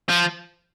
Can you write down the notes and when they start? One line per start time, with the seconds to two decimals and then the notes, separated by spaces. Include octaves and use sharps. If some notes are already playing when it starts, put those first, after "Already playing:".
0.09 F3